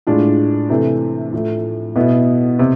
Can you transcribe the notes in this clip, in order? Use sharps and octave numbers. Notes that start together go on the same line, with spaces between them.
A2 G#3 D4 F4
C3 E3 A3
A2 F3 A3 E4
B2 B3 E4
C3